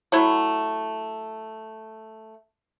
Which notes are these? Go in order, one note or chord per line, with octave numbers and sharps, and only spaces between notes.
F#3 A3 E4 F#5